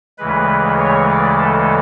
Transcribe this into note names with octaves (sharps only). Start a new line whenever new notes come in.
D2 C#3 E3 G#3 B4
C#5
D5
A4